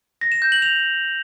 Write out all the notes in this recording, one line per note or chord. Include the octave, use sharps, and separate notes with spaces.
A#6
E7
G6
F#7
F7